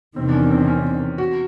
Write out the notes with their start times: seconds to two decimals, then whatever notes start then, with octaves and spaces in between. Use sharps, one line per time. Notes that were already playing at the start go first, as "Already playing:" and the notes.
0.16 E2 C3 D#3 C4
0.29 D4
0.33 C#4
0.50 C4
0.67 C#4
1.18 F#4